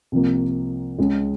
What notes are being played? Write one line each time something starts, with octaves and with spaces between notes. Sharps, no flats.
C2 C3 F3 A#3
C#2 C#3 G#3